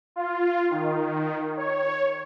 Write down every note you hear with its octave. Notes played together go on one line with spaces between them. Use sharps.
F4
D#3
C#5